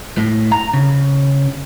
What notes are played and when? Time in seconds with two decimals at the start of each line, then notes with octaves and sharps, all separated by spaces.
0.17 A2
0.52 A#5
0.74 C#3